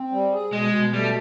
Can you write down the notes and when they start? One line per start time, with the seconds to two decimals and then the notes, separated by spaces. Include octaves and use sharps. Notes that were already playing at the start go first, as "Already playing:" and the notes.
Already playing: C4
0.12 G3
0.32 G#4
0.53 B2 G#3
0.74 B2
0.93 G3 A3